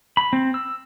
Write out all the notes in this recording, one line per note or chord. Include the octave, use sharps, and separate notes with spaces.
B5
C4
E6